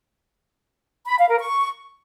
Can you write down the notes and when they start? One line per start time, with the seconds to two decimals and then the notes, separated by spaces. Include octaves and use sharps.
1.07 B5
1.18 F5
1.29 A#4
1.40 C#6